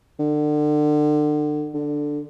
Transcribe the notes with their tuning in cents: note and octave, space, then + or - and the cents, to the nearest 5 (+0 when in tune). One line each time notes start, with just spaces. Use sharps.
D3 +30
D3 +5